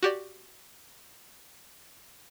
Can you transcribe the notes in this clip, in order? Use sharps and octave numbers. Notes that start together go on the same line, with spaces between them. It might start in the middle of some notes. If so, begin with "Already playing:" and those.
F#4 G4 D5